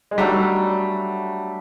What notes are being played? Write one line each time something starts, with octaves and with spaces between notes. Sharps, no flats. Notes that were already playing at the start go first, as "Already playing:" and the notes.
G#3
F#3 G3 A3 D4